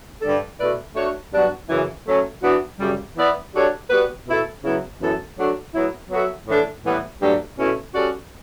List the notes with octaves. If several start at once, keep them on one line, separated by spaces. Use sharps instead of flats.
G2 D3 G3 D4 A4
B2 A3 E4 B4 D5
A3 D4 F#4 C#5
G2 F#3 B3 D4 F#4
F#2 C#3 E3
F#3 A3 C#4
E3 B3 D4 F#4
F#2 C#3 G3
E3 B3 E4 B4 D5
G3 D4 F#4 A4 C#5
G3 B3 F#4 B4
B2 A3 E4 A4
C#3 F#3 B3 E4
F#2 E3 B3 E4 A4
F#3 A3 D4 F#4
A2 F#3 B3 E4
F#3 B3 F#4 A4 E5
A2 E3 A3 D4 A4
A2 E3 G3 B3
G2 F#3 A3 D4 G4
B2 A3 C#4 E4
G3 C#4 F#4 A4 D5